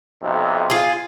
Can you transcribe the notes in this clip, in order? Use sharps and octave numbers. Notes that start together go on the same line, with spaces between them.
B1 F2 C3
F4 G#4